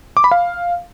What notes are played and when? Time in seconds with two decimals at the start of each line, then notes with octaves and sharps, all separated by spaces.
0.17 D6
0.24 B5
0.31 F5